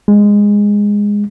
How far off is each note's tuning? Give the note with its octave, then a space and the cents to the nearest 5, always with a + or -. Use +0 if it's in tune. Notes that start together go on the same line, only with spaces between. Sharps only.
G#3 -15